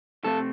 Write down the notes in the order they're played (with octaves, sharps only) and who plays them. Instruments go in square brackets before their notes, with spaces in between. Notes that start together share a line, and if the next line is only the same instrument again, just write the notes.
[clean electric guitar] C3 A3 C4 A4